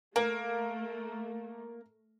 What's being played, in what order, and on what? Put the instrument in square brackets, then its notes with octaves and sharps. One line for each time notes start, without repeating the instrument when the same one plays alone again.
[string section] A3 [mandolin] A#3 [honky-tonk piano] A#4